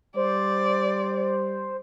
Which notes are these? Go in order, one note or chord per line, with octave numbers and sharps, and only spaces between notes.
G3 C5 D5